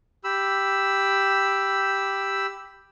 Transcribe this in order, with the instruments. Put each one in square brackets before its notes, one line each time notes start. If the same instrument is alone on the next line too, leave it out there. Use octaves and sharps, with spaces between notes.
[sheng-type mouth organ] G4 B5 E6